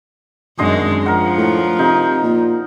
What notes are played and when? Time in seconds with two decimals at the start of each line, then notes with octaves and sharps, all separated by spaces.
0.59 G#1 F#2 D3 G#3 D#5 C6
1.06 F3 A#4 F#5
1.38 A2
1.79 C3 D#4
2.23 A#2